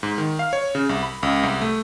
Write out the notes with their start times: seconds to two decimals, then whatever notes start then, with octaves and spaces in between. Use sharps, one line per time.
0.03 G#2
0.18 D#3
0.39 F5
0.53 C#5
0.75 C#3
0.89 C2
1.03 B5
1.23 C#2
1.43 C2
1.61 A3